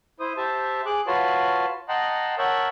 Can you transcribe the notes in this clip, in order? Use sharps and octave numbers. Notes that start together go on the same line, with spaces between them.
E4 C5 D#6
G4 C5 E5 A5
G#4 D6 F#6
F4 F#4 B4 C#5 A5 C6
D#5 F#5 G5 A5 A#5 C6
A#4 C#5 E5 F#5 G5 A5